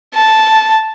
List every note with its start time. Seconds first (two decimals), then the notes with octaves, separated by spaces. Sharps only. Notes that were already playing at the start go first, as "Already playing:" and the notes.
0.14 A5